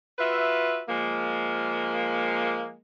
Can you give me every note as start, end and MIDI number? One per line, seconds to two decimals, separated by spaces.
0.19 0.82 65
0.19 0.82 66
0.19 0.82 71
0.19 0.82 76
0.89 2.76 53
0.89 2.76 56
0.89 2.76 58